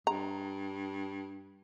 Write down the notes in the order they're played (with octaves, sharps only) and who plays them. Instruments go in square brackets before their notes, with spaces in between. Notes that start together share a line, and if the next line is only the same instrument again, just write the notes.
[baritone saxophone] G2 [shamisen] A#5